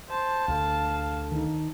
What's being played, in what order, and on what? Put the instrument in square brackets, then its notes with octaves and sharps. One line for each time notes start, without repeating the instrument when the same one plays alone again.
[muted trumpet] C5 [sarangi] A5
[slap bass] D2 D3 [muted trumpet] F5
[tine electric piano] D#3 D#4